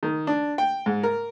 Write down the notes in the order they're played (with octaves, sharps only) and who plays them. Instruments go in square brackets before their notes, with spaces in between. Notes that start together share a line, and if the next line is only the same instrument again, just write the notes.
[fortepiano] D#3
D4
G5
G#2
A#4